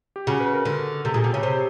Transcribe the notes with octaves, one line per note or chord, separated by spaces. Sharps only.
G4
C#3 F#4
B4
A#4
D3
C3 A4
A#2 G#4
B2 G4
C#3 C#5
C3 C5